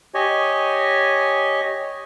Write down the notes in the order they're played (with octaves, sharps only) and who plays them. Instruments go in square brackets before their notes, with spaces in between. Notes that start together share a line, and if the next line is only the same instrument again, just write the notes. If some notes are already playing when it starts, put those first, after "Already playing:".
[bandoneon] G4 C#5 D#5 G#5